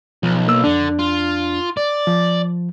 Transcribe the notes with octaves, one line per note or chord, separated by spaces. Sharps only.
B1 F3
A#3 E6
F2 D3 D4
F4
D5
F3